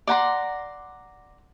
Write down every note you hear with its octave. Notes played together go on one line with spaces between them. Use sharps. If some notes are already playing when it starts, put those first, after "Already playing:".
D5 F#5 A#5 C6